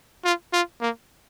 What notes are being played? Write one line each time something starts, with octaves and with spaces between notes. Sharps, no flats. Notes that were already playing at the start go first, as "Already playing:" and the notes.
F4
F4
A#3